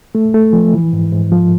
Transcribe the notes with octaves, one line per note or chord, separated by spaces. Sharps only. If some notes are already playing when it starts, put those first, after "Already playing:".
A3
A3
F3
E3
G#2
G#2
F3